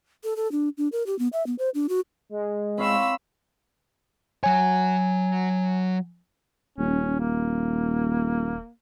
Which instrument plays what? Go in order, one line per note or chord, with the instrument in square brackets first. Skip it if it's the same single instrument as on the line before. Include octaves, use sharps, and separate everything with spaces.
[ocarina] A4
A4
D4
D4
A#4
G4
B3
E5
B3
C5
D4
F#4
[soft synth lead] G#3
[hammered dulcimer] C4 C#5 F5 [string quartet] B5 E6
[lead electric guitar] F#3 C#5 [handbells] G#5
[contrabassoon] D#1 [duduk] C#4
[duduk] A#3